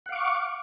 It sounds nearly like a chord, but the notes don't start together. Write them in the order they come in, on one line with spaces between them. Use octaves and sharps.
F#5 F5 D6 C#6